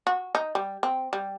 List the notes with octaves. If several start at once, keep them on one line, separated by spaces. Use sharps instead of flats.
F#4
D#4
G3
C4
G3